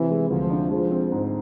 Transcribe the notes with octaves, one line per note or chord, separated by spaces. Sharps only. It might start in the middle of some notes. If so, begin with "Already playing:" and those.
Already playing: C3 E3
G#3
D2 F3
D4
F3 G#3
C4
G#2